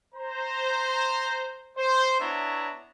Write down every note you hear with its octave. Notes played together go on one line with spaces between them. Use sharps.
C5 A#5
C5
B3 D4 E4 C#5 E5 A#5